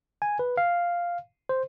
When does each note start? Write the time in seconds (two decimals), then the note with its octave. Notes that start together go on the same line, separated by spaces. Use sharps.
0.22 G#5
0.39 B4
0.57 F5
1.49 C5